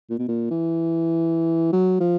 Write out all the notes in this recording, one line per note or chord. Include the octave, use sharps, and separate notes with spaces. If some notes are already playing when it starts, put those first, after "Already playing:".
A#2
B2
A#2
E3
F#3
F3